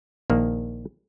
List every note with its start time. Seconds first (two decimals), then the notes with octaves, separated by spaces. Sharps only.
0.30 A#1 D#3 A#3